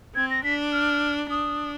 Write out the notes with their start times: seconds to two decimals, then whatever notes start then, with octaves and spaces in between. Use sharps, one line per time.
0.15 C4 G#6
0.31 A#6
0.44 D4 B6
0.72 F6
1.30 D4 D#6